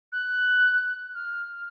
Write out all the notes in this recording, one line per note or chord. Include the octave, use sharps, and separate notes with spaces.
F#6
F6
F6